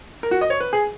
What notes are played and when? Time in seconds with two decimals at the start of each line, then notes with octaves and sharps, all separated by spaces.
0.23 A#4
0.31 F#4
0.41 D#5
0.50 C#5
0.60 B4
0.73 G#4